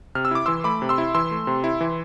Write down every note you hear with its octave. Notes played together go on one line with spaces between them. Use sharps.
C3 F6
E6
E4 D6
E3 C6 E6
A3 B5 D6
C3
C6 E6
E4
E3 C6 E6
A3
C3
E4
E3